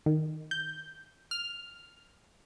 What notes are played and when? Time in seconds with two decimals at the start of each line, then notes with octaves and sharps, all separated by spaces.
0.06 D#3
0.51 G6
1.31 F6